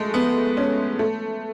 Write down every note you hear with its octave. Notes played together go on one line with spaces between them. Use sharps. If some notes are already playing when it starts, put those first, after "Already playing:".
Already playing: G#3 A3
B3
C#4
A3